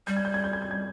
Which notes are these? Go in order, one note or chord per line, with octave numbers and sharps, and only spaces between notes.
G3 G6
G#6
G6
G#6
G6
G#6
G6
G#6